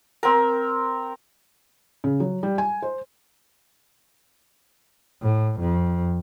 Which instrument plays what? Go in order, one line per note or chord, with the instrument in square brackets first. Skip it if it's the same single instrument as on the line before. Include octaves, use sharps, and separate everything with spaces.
[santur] C4 A#4
[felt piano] C#3
F#3
G3
G#5
C5
[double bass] A2
F2